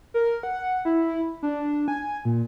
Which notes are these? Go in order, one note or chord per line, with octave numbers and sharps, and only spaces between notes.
A#4
F#5
E4
D4
G#5
A#2